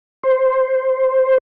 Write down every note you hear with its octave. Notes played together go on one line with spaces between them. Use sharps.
C5